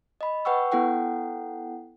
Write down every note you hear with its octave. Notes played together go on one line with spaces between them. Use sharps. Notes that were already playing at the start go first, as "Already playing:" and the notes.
D#5 B5
B4 F#5 G5 C#6 E6
B3 E4 A4 F#5 G5